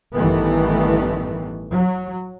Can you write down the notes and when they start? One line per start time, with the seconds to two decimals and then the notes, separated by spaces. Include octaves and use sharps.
0.13 A1 G2 D#3 E3 A3 B3
1.71 F#3